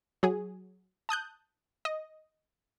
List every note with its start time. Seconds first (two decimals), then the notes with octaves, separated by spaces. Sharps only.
0.23 F#3 G#4
1.09 A5 D#6 F#6 G6
1.85 D#5